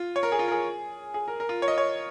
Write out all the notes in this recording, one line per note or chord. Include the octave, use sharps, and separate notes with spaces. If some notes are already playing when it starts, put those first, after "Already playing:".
Already playing: F4
C#5
A#4
G#4
F4
A#4
G#4
G#4
A#4
A#4
F4
C#5
D#5
C#5